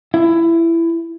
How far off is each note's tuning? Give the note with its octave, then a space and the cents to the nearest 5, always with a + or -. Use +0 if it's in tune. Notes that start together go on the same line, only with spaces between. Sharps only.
E4 +15